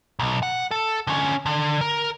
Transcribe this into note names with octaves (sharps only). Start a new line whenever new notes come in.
B1
F#5
A4
D3 C#4
D3
A#4